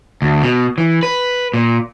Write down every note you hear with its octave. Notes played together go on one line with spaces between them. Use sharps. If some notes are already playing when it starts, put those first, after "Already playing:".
D2
B2
E3
B4
A#2